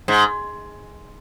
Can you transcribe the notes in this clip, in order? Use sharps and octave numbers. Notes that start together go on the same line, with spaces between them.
G#2